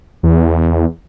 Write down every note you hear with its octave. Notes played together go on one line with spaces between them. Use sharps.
E2